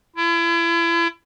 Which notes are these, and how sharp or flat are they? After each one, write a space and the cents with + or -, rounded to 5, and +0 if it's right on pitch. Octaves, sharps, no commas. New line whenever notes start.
E4 +35